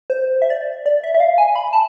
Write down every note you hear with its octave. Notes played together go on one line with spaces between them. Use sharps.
C5
E5
D5
D5
E5
E5
F5
G#5
B5
A5